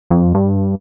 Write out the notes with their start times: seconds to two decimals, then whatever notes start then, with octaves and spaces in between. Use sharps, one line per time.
0.10 F2
0.34 G2